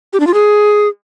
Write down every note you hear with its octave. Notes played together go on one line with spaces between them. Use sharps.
G4
D4
F4
G#4